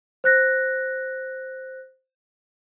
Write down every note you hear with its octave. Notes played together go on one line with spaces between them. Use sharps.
C5 F#6 A#6